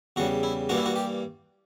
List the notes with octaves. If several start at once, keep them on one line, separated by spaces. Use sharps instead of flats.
E2 C#3 G3 F#4
E4
G2 E3 A#3 D4 F#4
E4
F#4
G4